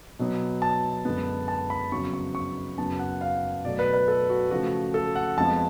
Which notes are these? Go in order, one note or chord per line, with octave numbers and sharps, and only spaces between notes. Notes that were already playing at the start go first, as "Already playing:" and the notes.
B2 F#3 B3
A5
F#2 D3 G#3 B3
A5
B5
F2 C#3 F#3 B3 C#6
C#6
C#6
F#2 C#3 F#3 B3 A5
F#5
F5
B2 F#3 A3 D5
B4
B4
A4
F#4
C#3 F3 A3 F#4
A4
F#5
F2 F3 G#3 B3 A5